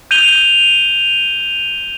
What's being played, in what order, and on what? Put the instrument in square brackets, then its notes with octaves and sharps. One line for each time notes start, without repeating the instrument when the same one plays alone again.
[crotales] G6 D#7 F7 G7